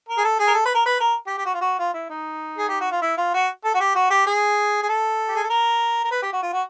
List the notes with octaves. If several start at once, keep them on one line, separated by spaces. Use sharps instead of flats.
A#4
G#4
A4
G#4
A#4
A4
B4
A#4
B4
A#4
G4
G4
F#4
F4
F#4
F4
E4
D#4
G#4
G4
F#4
F4
E4
F4
F#4
A4
F#4
G4
F#4
G4
G#4
G#4
A4
G4
G#4
A4
A#4
A#4
B4
G4
F#4
F4
F#4